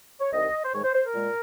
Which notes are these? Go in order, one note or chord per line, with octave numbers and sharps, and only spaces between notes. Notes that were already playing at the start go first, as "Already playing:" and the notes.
C#5
C2 C3 D#3 D#5
C5
G#2 D#3 G#3 C#5
C5
C5
A#4
A#2 G#3